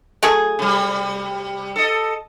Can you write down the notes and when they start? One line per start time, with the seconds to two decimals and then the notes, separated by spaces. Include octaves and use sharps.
0.23 F#3 A3 G#4
0.59 C3 G3
1.76 A4 D#5